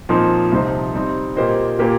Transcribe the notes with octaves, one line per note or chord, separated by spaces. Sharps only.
A#2 F3 C4 D#4
C2 C3 F3 D#4 C5
G3 C4 D#4
A#2 A#3 G4 C5 D#5
A#2 A#3 G4